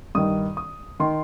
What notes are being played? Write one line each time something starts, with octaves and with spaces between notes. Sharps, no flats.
G2 D#3 D#6
D#6
D#3 C6